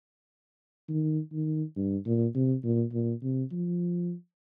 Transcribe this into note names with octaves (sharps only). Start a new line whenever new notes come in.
D#3
D#3
G2
A#2
C3
A#2
A#2
C3
F3